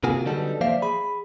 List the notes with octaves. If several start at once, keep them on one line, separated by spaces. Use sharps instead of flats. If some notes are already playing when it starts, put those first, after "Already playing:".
C3 A#3 F4 F#4 G#4
D3 F#3 G3 B3 D#4 A4
F3 A#3 C5 D5 E5 F5
G#4 B5